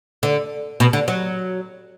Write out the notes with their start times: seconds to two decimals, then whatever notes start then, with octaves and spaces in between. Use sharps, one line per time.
0.23 D3
0.80 B2
0.93 D3
1.08 F#3